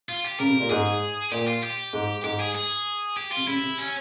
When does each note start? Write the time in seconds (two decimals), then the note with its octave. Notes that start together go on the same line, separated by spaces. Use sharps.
0.09 F4
0.24 G4
0.40 C#3 A#4
0.50 C3
0.60 A#2
0.70 G#2 G#4
1.32 A#2 G4
1.47 F4
1.63 G4
1.93 G#2
2.24 G#2 G4
2.40 G#4
2.55 G#4
3.17 G4
3.32 C3 F4
3.47 C#3 E4
3.63 C3
3.78 C#4